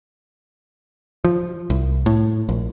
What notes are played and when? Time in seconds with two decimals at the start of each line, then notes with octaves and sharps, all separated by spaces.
1.25 F3
1.70 C2
2.06 A2
2.49 A#1